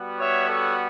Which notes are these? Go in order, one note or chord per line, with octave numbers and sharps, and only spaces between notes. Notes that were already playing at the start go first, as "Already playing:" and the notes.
Already playing: G3 B3 F#4
C#5 E5
A4 C#5